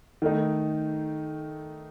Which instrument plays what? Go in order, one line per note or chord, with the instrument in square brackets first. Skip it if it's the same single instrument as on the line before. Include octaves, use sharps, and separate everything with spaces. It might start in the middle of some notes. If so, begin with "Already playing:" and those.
[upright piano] D#3 A3 D#4